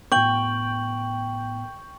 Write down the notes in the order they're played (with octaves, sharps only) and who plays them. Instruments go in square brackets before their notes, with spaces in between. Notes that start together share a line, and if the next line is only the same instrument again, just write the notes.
[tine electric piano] A2 B3 [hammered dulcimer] G5 [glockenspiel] C#6 F#7